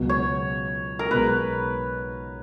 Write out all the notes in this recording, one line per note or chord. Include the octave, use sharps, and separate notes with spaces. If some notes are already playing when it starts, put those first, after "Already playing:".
Already playing: C#2 B2 F#3
C#5
A#4
B1 B2 G#3 B4